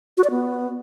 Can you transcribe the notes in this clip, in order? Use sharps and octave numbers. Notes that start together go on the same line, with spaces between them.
F#4
D5
B3